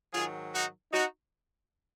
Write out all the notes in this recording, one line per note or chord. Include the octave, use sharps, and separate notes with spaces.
G#2 D#3 F#3 F4 G#4
D#4 F#4
D#4 F#4